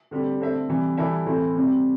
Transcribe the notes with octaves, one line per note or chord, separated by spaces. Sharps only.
D3 G3 C4 G4
D3 C4 A4 C5 E5
C3 E3 G3
E3 G3 E4 A4 E5
A2 E3 A3 C4 E4
C3 G3 C4